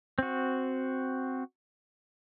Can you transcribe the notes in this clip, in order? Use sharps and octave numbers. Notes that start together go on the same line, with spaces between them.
C4 F#4